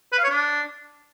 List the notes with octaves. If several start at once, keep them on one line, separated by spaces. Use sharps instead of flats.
B4
F5
C#5
D4